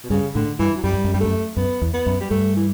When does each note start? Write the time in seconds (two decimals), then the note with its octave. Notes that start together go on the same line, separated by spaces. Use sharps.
0.04 B2
0.10 G2 C#3
0.35 A2 D3
0.59 G2 E3
0.76 F#3
0.83 F#2 G3
0.93 G2
1.04 F#2
1.14 G2 G3
1.20 F#2 A3
1.57 F#2 B3
1.82 E2
1.94 B3
2.06 F#2
2.21 G3
2.30 G2 A3
2.56 E3